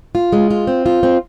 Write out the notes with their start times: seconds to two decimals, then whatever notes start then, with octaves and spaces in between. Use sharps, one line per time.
0.15 F4
0.33 G#3
0.50 F4
0.67 C4
0.86 F4
1.03 C4